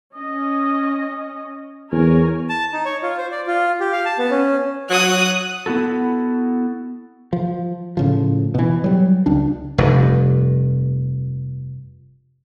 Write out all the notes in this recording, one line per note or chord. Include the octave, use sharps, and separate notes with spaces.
C#4 D#5
E2 A#4 C#5 G#5
A5
D#4
C#5
F4
C5
D5
F4
G4
F5
A5
B3
C#4
F#3 D#6 F#6
B3 E4 F#4 A4
F3
A2 C#3 F3
B2 E3
F#3 G3
C#2 D4
F1 G2